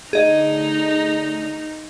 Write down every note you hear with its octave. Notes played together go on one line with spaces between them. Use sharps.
D3 A3 D#4 G#4 D#5